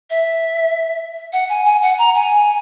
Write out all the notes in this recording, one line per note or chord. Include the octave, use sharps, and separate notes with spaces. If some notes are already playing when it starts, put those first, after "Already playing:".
E5
F#5
G#5
G#5
F#5
A#5
G#5